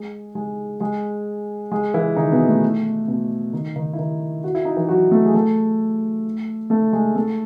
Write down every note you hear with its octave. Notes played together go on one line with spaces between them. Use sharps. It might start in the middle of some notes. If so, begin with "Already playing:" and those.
Already playing: G#3 G#4
G#3 G#4
G#3 G#4
G#3 G#4
E3 E4
D#3 D#4
B2 B3
A3
B2 B3
D#3 D#4
D#3 D#4
E4
D#3 D#4
F#4
E4
D#4
E3 E4
F#3 F#4
A3 A4
G#4
A3 A4
A3 A4
G#3 G#4
A3 A4